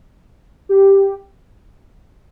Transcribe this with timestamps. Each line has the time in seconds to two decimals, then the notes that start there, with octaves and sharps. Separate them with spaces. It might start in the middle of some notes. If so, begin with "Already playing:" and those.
0.69 G4